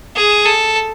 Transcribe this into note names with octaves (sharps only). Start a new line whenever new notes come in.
G#4
A4